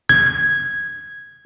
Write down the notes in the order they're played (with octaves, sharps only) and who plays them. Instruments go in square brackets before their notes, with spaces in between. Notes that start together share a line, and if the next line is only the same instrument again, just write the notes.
[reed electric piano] G#6